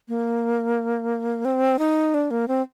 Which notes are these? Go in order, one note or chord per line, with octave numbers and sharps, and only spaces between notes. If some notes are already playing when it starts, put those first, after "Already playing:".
A#3
C4
D#4
D4
A#3
C4